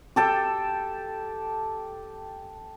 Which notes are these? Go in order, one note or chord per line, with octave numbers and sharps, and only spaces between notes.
G4 A4 G5